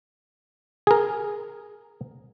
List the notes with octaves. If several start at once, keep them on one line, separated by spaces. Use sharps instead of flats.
G#4 A#4